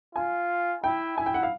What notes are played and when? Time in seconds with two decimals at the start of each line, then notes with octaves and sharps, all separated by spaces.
0.15 F4 G#5
0.84 E4 G5
1.17 E4 G#5
1.26 G5
1.34 F#5
1.43 F5